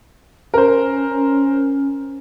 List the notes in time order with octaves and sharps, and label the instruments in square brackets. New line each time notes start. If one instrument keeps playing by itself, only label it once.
[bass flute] C#4 [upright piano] A#4 C5